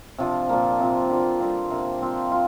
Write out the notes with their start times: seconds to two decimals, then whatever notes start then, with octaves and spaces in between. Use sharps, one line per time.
0.18 C3 F3 D4
0.49 A#2 F3 A#3
0.79 C3 F3 C4 F4
1.10 D3 A#3 F4
1.40 D3 G3 C4 F4
1.70 C3 A#3 D4
2.01 F3 C4 F4
2.32 F4